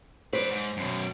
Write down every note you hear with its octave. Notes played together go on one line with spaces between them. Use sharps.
B4 C5 D5
G#2
F#2 B2